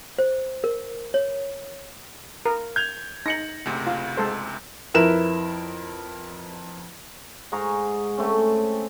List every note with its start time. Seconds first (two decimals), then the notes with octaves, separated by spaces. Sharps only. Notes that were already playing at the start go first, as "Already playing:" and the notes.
0.19 C5
0.64 A#4
1.14 C#5
2.46 A#4
2.76 G6 G#6 F7
3.26 D#4 A#6 C#7 F#7
3.66 F#1 D2 C3
3.87 F4
4.17 G#3 A4 C5
4.94 F2 E4 A#4 B4 E7
7.52 G#2 G#4 A#5 C#6
8.18 A3 C4 C#4